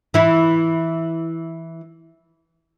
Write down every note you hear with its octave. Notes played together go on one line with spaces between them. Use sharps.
E3 E4